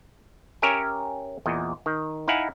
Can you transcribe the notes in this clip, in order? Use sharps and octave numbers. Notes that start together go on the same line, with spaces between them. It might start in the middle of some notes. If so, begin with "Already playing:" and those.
C#4 G4 A#4 C#5 E5 G#5
E2 A#2 D#5
D#3
D#4 E4 F5 F#5 G#5